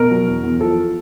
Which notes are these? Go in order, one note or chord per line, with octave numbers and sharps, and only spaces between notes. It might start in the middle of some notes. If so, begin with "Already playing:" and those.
Already playing: B2 A#4
F#3
E2
E2
F3 A4